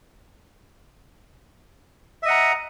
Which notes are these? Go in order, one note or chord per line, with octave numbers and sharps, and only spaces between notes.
D#5 E5 F#5 A#5